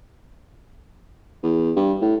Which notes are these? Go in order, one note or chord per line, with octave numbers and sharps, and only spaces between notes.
E2
G2
A2